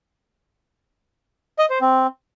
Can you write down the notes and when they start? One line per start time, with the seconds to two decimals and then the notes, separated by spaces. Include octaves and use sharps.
1.59 D#5
1.70 C5
1.81 C4